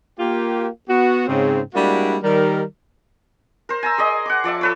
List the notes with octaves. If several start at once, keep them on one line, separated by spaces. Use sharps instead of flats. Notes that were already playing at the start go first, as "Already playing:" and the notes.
A#3 F4 G4
B3 F#4
G#2 C#3 C4
G3 G#3 A#3 D4 E4 F#4
D#3 G3 A#4
A#4 C5
G#5 A#5 E6
G#4 D5 D#5
F#5 D6
F3 D5 E5 A5
A4 B4 C#5